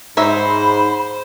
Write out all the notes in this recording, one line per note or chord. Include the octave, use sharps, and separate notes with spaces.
G#2 D#4 C5 C#5 E5 B5